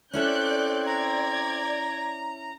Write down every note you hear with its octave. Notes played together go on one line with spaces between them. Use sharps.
C4 C#4 E4 A4 D5 F#6 G6
D5 A#5 G#6